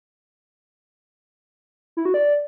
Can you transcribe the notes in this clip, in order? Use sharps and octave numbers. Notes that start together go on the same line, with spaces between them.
E4
F#4
D5